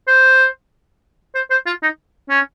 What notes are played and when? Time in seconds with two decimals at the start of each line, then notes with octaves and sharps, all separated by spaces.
0.08 C5
1.35 C5
1.51 C5
1.66 F4
1.83 D#4
2.30 C#4